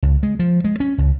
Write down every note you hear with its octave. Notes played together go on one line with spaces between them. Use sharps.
C#2
G#3
F3
G#3
C#4
C#2